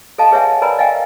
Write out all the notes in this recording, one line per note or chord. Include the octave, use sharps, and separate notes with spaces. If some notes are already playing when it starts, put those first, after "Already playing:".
A4 D#5 F5 A5
G#4 B4 C#5 E5 F#5 G#5
A#4 B4 D5 G#5 A#5 B5
D#5 F5 G5 G#5